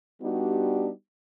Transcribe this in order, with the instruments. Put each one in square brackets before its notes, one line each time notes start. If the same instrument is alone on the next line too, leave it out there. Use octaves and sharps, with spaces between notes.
[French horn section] G3 B3 D4 D#4 F#4 G4